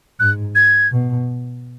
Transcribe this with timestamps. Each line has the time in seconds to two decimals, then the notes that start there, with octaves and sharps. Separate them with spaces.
0.19 G#2 F#6
0.55 G#6
0.92 B2